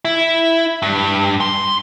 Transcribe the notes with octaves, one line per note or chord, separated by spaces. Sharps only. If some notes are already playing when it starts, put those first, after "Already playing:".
E4
G2
C6